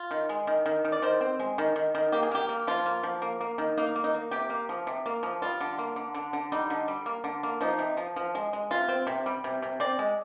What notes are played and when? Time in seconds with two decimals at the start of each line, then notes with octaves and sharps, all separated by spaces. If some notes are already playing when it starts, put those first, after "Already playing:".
Already playing: F4
0.11 D#3
0.29 G#3
0.47 D#3
0.66 D#3
0.85 D#3
0.92 D5
1.02 D#3 C5
1.21 C4
1.40 G#3
1.58 D#3
1.76 D#3
1.95 D#3
2.12 A#3 G4
2.23 G#4
2.31 A#3 G4
2.49 A#3
2.67 F3 F4
2.86 A#3
3.03 F3
3.22 A#3
3.41 A#3
3.58 D#3
3.78 A#3 D#4
3.96 A#3
4.04 D#4
4.14 A#3
4.31 C3 G4
4.50 A#3
4.69 F3
4.87 C3
5.06 A#3
5.23 F3
5.42 G3 F4
5.61 D3
5.78 A#3
5.96 D3
6.14 D3
6.33 D3
6.52 G3 D#4
6.70 D3
6.88 G3
7.06 A#3
7.24 D3
7.43 A#3
7.61 F3 D#4
7.79 C3
7.97 F3
8.16 F3
8.35 G#3
8.53 G#3
8.71 C3 F4
8.88 C4
9.07 C3
9.26 G3
9.44 C3
9.62 C3
9.80 C4 D5
9.99 G#3